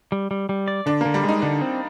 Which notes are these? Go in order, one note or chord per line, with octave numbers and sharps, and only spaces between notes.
G3
G3
G3
D5
D3 D4
D3 A#3
G3
G#3 D#4
D3 D4
C4